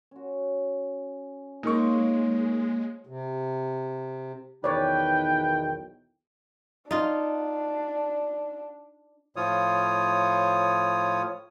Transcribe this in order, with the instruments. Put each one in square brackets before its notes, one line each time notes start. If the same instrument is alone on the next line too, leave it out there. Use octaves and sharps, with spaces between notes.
[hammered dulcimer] C#4 F#4
[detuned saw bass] G#3 [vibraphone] A#3 [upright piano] D#4 A#4 C#6 [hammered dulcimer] F4 C5 C#5
[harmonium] C3
[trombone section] B1 E2 D#3 [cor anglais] B4 [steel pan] C#5 D5 [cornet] G5
[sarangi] D4 [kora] D#4 F4
[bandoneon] A2 F3 F4 C#5 D#6